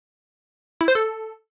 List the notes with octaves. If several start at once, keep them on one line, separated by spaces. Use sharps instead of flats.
E4
C5
A4